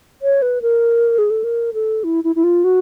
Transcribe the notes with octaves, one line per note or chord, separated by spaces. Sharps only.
C#5
B4
A#4
G#4
A4
A#4
A4
E4
E4
E4
F4
F#4